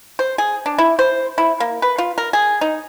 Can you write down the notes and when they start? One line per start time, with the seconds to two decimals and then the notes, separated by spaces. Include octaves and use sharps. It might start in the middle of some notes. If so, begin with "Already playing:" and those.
0.19 C5
0.38 G#4
0.66 D4
0.78 E4
0.99 C5
1.38 E4
1.60 A#3
1.82 B4
1.98 F4
2.18 A#4
2.33 G#4
2.61 D#4